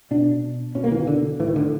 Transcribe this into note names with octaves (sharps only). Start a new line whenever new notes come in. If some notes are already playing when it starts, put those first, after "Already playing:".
B2 D4
B2 C#4
A#3
E3
D#3
D3
A2 E3
D#3
D3